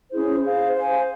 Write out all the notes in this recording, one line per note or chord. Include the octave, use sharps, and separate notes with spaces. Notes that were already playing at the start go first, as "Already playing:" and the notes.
C#4 E4 G#4 C5
G#4 C5 F5
C5 F5 G#5